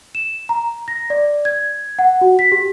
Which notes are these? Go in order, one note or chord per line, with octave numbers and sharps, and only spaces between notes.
E7
A#5
A#6
D5
G#6
F#5
F#4
B6
G4